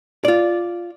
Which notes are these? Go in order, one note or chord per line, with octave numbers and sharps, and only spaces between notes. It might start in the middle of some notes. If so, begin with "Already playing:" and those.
F4 D5